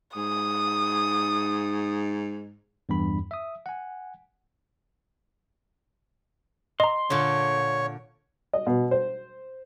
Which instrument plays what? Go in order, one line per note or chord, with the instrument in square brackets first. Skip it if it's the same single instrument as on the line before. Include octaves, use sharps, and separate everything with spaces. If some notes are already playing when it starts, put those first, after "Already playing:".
[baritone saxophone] G#2 [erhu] D#6
[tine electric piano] E2 G2 B5
E5 D#6
F#5 G#5
[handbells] D#5 A#5 [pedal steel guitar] C6
[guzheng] A#2 D3 [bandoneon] C#5
[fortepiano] D#5
B2
C5